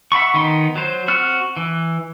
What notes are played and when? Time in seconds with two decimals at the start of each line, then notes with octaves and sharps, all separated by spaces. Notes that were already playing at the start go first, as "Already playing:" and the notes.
0.12 E5 F#5 B5 C#6
0.34 D#3 B3 D#4 C6
0.76 F#3 C5
1.08 C4 F#4 F6
1.57 E3